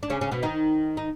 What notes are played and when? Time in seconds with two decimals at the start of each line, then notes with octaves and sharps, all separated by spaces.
0.03 D4
0.10 C#3 C#4
0.21 C#3 C#4
0.31 B2 B3
0.43 D#3 D#4
0.97 D#4